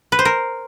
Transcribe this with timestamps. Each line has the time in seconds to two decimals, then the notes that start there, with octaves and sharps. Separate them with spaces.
0.12 B4
0.19 C5
0.25 A#4